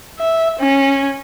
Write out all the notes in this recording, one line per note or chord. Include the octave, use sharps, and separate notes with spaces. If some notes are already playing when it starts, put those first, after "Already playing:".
E5
C#4